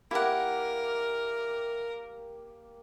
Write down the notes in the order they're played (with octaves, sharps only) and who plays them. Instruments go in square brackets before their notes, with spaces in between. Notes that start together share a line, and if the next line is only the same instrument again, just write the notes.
[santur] A#3 G4 [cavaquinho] E4 F#5 [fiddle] A#4